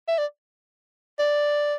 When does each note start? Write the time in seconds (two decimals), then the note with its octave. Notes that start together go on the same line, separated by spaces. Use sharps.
0.08 E5
0.18 D5
1.19 D5